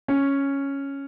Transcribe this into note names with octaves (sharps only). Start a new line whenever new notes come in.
C#4